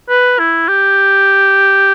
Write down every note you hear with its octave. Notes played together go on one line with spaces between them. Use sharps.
B4
E4
G4